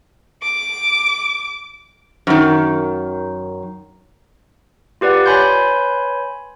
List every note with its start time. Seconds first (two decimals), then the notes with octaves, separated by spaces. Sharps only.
0.43 D6
2.27 F#2 D#3
5.01 F4 G4 B4 D5 F#5
5.26 B4 C#5 G#5 B5 C6 G6